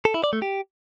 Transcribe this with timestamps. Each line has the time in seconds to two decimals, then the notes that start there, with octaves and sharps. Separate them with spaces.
0.05 A4
0.14 E4
0.24 D5
0.33 A3
0.42 G4